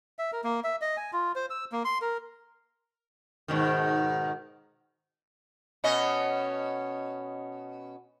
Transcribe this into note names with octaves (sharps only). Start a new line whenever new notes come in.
E5
A#4
A#3
E5
D#5
G#5
F4
C5
E6
A#3
C6
A#4
G#2 B2 D#3
B2 C#4 D#5